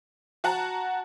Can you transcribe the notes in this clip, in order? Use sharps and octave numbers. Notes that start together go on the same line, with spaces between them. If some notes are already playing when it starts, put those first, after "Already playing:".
F#4 F#5 A5 A#5